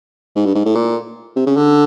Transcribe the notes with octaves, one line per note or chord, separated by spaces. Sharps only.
G#2
G2
G#2
A2
A#2
C3
C#3
D3